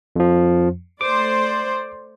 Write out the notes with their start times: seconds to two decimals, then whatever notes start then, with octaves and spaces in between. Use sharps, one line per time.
0.16 F2 F3
1.01 A3 C5 D5 D6